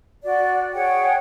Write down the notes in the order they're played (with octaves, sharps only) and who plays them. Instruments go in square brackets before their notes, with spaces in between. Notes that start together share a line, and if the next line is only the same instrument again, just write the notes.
[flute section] F#4 D5
G#4 C#5 F#5 G5